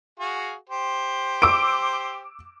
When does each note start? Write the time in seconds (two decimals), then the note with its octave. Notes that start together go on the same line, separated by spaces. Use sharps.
0.20 F#4 G#4 F5
0.70 G4 C5
1.42 D6 E6 D7